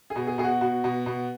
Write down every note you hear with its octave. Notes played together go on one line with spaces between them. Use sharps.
G#4
B2
G#4
B2 G#4
F#4
B2 F#4
B2
B2